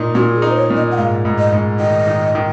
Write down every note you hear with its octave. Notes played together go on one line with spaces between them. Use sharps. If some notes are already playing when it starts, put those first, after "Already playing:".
Already playing: A#2 D#4
A#2 F#4
G#4
D#4
C5
C#5
A#2
D#5
F#5
G#2 F5
G#2
D#5
G#2
D#3 D#5
D#3
D#3